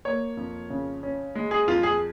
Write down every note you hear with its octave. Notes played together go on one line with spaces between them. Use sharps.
A#3 C#5
F2
C#3
C#4
G#3
G#4
F2 F4
G#4